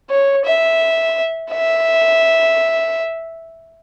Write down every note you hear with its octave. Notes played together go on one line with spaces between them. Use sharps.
C#5
E5
E5